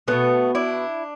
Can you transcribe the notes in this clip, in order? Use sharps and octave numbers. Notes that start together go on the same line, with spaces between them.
B2 G#3 A3 B3
D4 E4